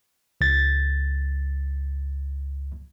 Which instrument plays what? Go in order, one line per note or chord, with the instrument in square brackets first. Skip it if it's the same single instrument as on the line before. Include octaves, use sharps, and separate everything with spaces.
[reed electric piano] C#2 A6